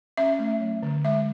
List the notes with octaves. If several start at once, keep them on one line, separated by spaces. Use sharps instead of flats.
C#4 E5
A3
F#3
D3
G#3 E5